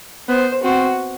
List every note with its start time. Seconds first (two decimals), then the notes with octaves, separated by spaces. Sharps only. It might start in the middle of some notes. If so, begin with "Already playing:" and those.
0.28 B3 C5
0.63 C4 F#4